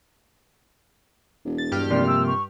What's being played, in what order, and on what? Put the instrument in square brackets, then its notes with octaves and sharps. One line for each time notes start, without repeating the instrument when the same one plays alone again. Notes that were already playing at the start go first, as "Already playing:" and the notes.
[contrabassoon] E1
[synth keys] A6
G2 G4 F6
[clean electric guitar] C3 F3 A#3 [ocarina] D5
[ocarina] E6
C#6